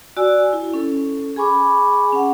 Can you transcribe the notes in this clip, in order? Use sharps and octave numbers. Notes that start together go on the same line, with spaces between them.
F#4 D5 G#5 E6
E4
C#4 A4
G#4 G#5 B5 C#6 D6
C#4 F#5